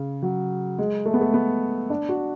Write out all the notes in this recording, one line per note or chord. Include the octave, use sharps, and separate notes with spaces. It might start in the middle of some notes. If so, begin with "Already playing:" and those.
Already playing: C#3
F#3
G#3
A3
B3
A3
B3
D4
F#4